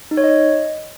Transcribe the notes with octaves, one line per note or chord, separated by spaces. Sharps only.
D#4
C#5
D#5